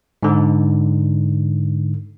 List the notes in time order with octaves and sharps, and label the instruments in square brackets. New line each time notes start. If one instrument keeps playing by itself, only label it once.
[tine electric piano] G#2 D3